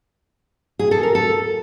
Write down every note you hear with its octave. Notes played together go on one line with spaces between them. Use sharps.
G#4
A4
A#4
A4